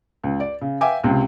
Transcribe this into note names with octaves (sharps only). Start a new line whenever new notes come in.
C#2
D5
C#3
E5 F5 G5 G#5 D6
C#2 C3